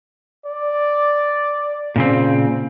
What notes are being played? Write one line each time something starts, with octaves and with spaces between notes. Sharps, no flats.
D5
A#2 C#3 C4